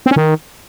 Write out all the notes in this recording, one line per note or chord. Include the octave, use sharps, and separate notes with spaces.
C4
C#4
D#3